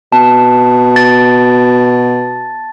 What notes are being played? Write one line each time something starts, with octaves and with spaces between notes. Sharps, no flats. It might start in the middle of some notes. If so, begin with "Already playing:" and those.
B2 A5
A6